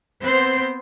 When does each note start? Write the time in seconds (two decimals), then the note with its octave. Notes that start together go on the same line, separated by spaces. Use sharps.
0.23 B3 C4 C5